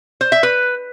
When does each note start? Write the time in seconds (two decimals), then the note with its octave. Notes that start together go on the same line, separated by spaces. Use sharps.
0.21 C5
0.32 E5
0.43 B4